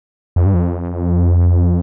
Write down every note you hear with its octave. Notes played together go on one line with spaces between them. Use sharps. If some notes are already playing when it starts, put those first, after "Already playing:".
F2
G2
F2